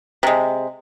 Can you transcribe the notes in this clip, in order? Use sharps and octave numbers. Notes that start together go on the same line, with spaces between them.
C3 G#3